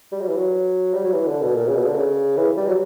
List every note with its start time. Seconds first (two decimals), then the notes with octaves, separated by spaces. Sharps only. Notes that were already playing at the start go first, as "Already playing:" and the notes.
0.12 G3
0.21 F#3
0.28 E3
0.37 F#3
0.94 G3
1.04 F#3
1.13 E3
1.27 D3
1.42 B2
1.55 A#2
1.68 C#3
1.76 B2
1.86 D3
1.96 C#3
2.37 E3
2.57 G3
2.67 F#3